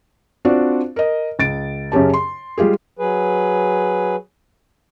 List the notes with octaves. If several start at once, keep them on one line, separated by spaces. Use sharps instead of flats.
C4 D4 F4 F#4 D5
A#4 D#5
C#2 A6 D7
F#2 C#3 C#4 G4 A5
C6
G3 G#3 F4 G4 G#4
F#3 G#4 B4